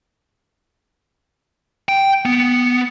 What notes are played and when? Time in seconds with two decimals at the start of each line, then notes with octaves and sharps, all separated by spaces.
1.89 G5
2.25 B3